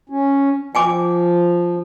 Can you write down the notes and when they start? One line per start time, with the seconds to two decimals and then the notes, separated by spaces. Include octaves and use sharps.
0.10 C#4
0.75 F3 G5 G#5 D6